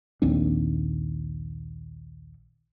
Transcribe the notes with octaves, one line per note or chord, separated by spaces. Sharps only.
A#1 D#2 C4 D4